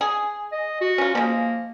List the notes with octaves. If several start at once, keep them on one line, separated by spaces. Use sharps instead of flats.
G#4
D#5
F#4
C#4 F4
F3 G#3 A#3